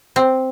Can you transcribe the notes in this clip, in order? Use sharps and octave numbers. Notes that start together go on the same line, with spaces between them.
C4